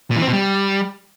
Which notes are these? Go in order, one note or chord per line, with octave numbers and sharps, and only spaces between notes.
A#2
E3
C4
B2
G3